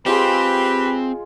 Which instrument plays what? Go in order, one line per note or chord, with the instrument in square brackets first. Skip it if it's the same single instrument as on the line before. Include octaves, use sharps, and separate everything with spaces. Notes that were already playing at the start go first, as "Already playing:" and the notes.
[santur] G#3 F4 G#4 [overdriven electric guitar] C4 [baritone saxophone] G4 [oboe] B4